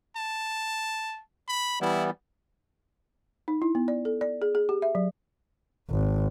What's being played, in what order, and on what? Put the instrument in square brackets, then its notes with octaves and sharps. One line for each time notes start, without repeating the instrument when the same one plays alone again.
[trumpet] A5
B5
[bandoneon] E3 G3 B3 [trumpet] E4
[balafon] D#4
E4
B3
D5
A4
D5
G#4
G#4
G4
E5
F#3
[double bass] G#1